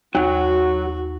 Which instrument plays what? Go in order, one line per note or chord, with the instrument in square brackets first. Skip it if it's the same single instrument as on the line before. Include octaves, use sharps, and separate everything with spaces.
[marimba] D#2 [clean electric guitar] F#3 [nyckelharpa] F#4